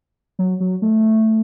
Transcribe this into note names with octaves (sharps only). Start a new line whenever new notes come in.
F#3
F#3
A3